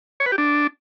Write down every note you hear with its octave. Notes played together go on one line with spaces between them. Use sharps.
C#5
B4
G4
D4